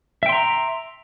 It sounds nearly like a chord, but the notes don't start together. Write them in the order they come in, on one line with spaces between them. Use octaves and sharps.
E5 G5 C6 A#5